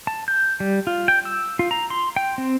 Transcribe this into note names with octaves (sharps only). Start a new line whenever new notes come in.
A5
G6
G3
F4
G5
E6
F4
A#5
C6
G5
C4